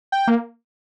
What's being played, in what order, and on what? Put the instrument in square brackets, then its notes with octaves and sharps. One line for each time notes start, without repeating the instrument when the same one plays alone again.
[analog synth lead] G5
[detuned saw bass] A#3